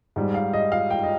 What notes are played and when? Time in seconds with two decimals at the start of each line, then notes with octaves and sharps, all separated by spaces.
0.16 G#2 G3
0.34 F5
0.53 D#5
0.72 F5
0.90 G5
1.03 D#5